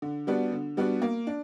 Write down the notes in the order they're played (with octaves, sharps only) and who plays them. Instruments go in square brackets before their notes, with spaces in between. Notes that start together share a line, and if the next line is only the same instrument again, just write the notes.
[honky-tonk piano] D3
G3 B3 D4 F#4
D3
G3 B3 D4 F#4
A#3
D4